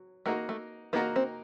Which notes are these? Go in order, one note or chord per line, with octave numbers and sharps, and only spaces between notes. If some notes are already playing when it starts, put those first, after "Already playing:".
Already playing: F#3
A3 A#3 D#4 F#4 A#4
A3
A#3 B3 D#4 F#4 A#4
C4